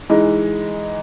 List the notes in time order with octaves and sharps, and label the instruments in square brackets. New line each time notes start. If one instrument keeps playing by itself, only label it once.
[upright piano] E3 G#3 D#4